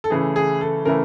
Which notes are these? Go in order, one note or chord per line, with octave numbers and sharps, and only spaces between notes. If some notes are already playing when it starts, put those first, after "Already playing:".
A4
C#3 E3 A3 G#4
G#4
A4
C#3 E3 A3 A#4